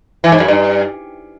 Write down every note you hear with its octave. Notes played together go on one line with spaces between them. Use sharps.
E3
G#2
F#2
G2